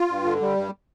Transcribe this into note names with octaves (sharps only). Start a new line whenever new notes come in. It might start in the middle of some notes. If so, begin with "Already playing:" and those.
Already playing: F4
G2
D3
G3
G2